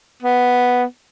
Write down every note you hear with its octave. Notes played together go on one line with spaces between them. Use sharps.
B3